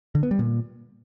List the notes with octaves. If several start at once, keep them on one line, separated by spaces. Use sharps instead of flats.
D3
B3
G3
A#2